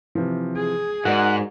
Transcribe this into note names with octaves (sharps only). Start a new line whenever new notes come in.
C3 E3 F3
G#4
G#2 F#4 A#4 D5 F#5 F#6